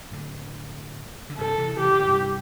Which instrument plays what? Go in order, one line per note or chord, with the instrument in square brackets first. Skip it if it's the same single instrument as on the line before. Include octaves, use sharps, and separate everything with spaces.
[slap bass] A2 D3
D3
[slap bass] G2 C3 [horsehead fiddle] A4
[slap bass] C3 E3
[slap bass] C3 E3 [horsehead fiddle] G4
[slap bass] A2 D3
G2 C3